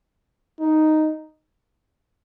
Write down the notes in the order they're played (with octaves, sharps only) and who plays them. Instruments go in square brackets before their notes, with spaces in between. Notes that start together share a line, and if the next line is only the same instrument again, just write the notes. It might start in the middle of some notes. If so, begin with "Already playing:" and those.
[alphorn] D#4